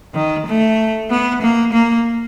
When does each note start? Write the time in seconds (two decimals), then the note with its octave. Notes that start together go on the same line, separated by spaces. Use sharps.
0.14 D#3
0.46 A3
1.10 B3
1.42 A#3
1.73 A#3